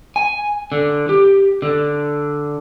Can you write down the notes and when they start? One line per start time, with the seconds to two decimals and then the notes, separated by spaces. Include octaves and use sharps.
0.16 G#5
0.72 D3
1.09 G4
1.62 D3